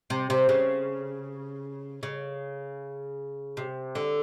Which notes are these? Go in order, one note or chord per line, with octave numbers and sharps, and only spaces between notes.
C3
C3
C#3
C#3
C3
D3